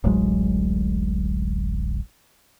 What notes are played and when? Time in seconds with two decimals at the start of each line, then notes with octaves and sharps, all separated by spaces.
0.04 D1 A1 F#3 G#3